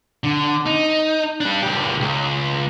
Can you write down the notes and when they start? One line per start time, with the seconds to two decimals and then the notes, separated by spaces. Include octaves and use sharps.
0.24 D3
0.66 D#4
1.41 G3 D4
1.63 C#2 G4
2.00 C#2